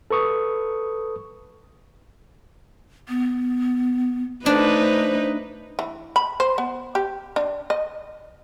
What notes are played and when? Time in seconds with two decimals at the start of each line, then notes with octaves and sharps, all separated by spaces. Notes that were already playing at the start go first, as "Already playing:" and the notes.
0.11 A4 B4 C#6 D#6
3.09 B3
4.46 A3 D4 D#4 B4 C5
5.79 E3
6.16 B5
6.40 C5
6.58 B3
6.95 G4
7.36 D4
7.70 D#5